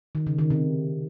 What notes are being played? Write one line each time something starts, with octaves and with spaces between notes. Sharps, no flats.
D#3
C#3
D#3
C3